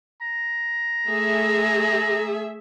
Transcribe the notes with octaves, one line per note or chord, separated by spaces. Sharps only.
A#5
A3 G#4 E5